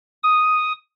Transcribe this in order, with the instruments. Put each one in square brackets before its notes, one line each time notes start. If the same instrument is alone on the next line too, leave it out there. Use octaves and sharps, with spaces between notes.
[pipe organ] D#6